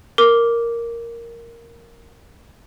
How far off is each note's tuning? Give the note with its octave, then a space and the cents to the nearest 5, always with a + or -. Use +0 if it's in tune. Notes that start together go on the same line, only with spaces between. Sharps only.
A#4 +0 D6 -10